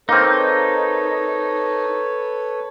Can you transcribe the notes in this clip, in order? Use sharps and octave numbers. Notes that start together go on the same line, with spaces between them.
A#3 C4 D#4 A4 B4 C#5